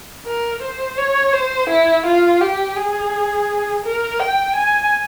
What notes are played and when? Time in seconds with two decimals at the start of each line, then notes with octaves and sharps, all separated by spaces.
0.26 A#4
0.62 C5
0.98 C#5
1.33 C5
1.69 E4
2.06 F4
2.41 G4
2.76 G#4
3.85 A#4
4.20 G5
4.56 G#5